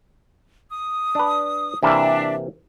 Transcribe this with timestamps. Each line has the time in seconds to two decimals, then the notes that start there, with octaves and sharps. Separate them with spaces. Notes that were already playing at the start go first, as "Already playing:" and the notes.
0.70 D#6
1.15 D4 B4
1.83 C3 E3 A#3 D4 E5